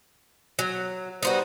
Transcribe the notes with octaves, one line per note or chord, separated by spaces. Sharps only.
F#3
G3 B3 D#4 F4 F#4 C5